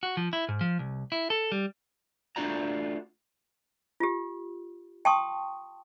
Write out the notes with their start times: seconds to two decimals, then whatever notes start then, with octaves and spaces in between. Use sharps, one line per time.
0.03 F#4
0.17 F3
0.33 E4
0.49 G#2
0.61 F3
0.79 C2
1.12 E4
1.30 A4
1.52 G3
2.36 A3 D4 F4 F#4 D5 A#5
4.00 F4 G4
5.05 G5 A5 C6 C#6 D#6